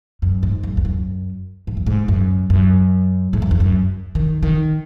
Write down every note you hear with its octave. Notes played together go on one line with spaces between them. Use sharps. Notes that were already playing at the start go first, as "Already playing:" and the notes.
F#2
G#2
F#2
E2
F#2
G#2
F#2
G#2
F#2
F#2
G#2
F#2
E2
F#2
D#3
D#3